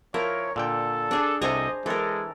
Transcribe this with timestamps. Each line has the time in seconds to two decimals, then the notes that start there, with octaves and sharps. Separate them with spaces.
0.14 F3 E4 A#4 C#5
0.56 A#2 D3 A4 G5
1.11 D4 G#4
1.42 C2 C3 A4 C5 D#5 G#5 A#5
1.86 E3 G#3 A4 A#4